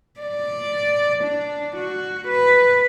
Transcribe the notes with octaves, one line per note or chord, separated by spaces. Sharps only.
D5
D4
F#4
B4